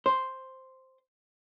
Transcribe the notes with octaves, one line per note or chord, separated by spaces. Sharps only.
C5